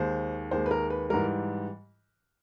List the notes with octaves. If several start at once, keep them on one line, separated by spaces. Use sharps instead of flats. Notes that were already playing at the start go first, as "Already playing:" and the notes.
Already playing: D#2 D#3 G#3 C5
D#2 D#3 G#3 C5
B4
A#4
B4
G#2 E3 G3 A#4